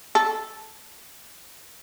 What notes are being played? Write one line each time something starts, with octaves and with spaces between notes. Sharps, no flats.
A4